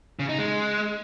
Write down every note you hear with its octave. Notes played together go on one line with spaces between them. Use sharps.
C#3
D#4
G#3